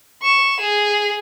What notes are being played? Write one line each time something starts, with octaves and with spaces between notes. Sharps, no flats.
C#6 E7
G#4